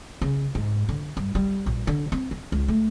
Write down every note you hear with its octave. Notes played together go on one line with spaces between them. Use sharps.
C#3
G#2
D3
G2
G3
A#1
D3
C4
D3
C#2
A3